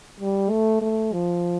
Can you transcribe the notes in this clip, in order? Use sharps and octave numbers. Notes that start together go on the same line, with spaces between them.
G3
A3
A3
F3